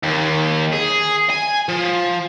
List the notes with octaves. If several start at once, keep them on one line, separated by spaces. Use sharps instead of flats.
D#2
G#4
G#5
F3